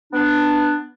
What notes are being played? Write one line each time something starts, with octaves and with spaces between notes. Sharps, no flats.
B3 D4